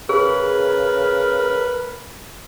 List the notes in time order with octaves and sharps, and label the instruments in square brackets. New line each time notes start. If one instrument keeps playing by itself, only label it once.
[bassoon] C#3 [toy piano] G#4 [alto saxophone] A#4 [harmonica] B4